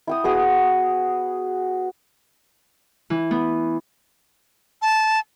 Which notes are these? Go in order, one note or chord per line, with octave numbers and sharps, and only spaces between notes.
E4 G5 D#6
B3 F#4 G#4 D#6
E3
B3
A5